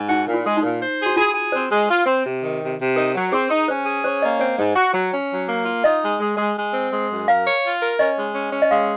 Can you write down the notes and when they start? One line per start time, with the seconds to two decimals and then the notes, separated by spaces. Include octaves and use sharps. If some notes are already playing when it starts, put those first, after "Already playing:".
Already playing: G#2
0.09 D#4 F#4
0.27 A#2
0.34 F4
0.46 G#3
0.57 D#4
0.63 A#2
0.82 C5
0.99 G#4
1.06 F#4
1.16 F4 G#4
1.35 G#4
1.52 C4 C5
1.70 G#3
1.88 F4
2.06 C4
2.25 C3
2.43 D#3
2.61 C3
2.79 C3
2.96 D#4 A#4
3.15 F#3
3.32 C4 G#4
3.50 D#4
3.68 C#4 C5
3.86 G#4
4.04 C#4 C5
4.22 A#3 D#5
4.39 C4 C#5
4.58 G#2
4.76 F#4
4.94 F#3
5.12 C#4
5.30 F#3
5.47 A#3
5.66 F4
5.84 D#4 D#5
6.02 G#3
6.20 G#3
6.37 G#3
6.56 G#3
6.73 C4
6.92 G#3
7.10 F#2
7.27 A#4 F5
7.46 C#5
7.63 F4
7.81 A#4
7.99 C#4 D#5
8.17 G#3
8.35 C#4
8.53 C#4
8.62 D#5
8.71 G#3 F5